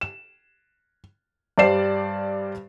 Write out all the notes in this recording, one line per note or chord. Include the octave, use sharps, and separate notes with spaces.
E7
G2 G3 C5 D5 C7 E7